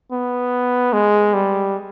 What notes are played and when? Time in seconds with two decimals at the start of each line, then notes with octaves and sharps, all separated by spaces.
0.12 B3
0.93 G#3
1.34 G3